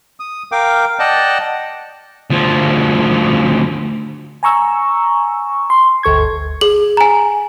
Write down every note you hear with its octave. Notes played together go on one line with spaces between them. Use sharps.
D#6
A#4 F5 G5 D6
D5 D#5 F#5 G5 A5
D2 F3
G#5 A#5 C#6 E6
C6
G1 D2 A4 C#6 G#6
G#4 F#7
G#5 A#5